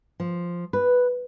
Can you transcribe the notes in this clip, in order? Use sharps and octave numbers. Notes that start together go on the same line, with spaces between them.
F3
B4